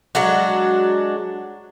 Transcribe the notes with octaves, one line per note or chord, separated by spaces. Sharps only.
F#3 G#3 D4 F#4